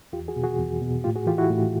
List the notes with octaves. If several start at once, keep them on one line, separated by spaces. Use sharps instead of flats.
E2 F4 G4
F#4 G#4
B2
F#4 G#4
E2
B2
A2 F4 G4
F#4 G#4
E3 F4 G4
E4 F#4
A2